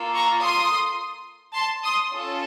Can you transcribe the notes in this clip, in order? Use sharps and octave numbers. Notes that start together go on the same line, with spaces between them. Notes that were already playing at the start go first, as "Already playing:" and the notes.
Already playing: A#3 F4 A4
A#5 C#6
C6 D#6
A5 C6
C6 D#6
C#4 F4 A4